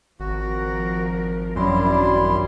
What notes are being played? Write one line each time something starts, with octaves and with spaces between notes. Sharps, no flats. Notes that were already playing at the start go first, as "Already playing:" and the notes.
G#1 F3 F#4 A#4
F#2 F3 G3 D4 E4 C6